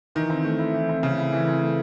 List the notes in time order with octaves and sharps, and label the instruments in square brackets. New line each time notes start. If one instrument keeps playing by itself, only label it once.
[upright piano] D#3 [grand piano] E3
[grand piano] C4
A3
E4
E3
C4
[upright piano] C#3 [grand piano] A3
[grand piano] E4
E3
C4
A3